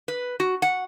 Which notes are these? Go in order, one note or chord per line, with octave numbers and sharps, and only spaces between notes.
B4
F#4
F#5